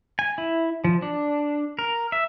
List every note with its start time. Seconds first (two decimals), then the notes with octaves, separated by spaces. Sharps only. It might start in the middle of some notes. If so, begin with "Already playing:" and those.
0.19 G#5
0.38 E4
0.84 F3
1.02 D4
1.79 A#4
2.12 E5